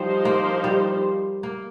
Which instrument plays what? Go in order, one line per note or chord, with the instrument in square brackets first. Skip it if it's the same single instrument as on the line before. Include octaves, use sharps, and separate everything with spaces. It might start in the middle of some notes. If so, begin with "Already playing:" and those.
Already playing: [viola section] F3 D#4 C5 [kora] G3
[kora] A#3
G3
A#3